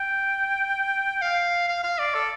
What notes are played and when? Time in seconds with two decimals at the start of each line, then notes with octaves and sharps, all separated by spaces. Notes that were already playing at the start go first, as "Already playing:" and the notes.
Already playing: G5
1.22 F5
1.68 F5
1.84 F5
1.99 D5
2.14 A4